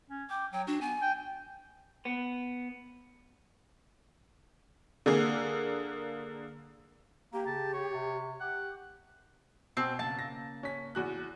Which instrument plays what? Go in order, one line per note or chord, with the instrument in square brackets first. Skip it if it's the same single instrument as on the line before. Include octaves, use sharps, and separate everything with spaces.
[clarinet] C#4
[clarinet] G5 [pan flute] D6
[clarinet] F#3 [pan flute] G5
[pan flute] D4 [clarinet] F#4
[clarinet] B3 [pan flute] G#5
[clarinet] G5
[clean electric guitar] B3
[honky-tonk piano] D3 A#3 G#4
[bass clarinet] A#3 [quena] G4
[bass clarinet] C#3 [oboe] A5
[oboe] C#5
[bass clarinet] C3
[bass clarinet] G4 [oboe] F#5
[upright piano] B2 [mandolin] C4 [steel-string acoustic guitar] G#5
[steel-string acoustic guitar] C#3 A#3 [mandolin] A5
[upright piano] A#6
C#4 B6
E2 F#4 F#6